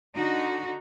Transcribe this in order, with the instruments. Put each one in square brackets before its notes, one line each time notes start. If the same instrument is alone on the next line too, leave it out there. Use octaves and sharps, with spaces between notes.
[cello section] D3 D#4 F#4